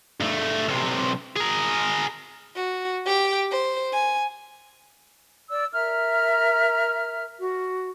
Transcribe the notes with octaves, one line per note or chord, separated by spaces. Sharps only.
G2 A3
B1 C3
G#4 A#4
F#4
G4 G5
C5
G#5
D5 E6
A#4 E5 A#5 F6
F#4